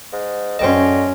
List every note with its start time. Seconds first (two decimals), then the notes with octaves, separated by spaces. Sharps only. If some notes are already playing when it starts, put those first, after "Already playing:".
0.12 G#2
0.59 F#2 D3 C#4 D#5 G5 C6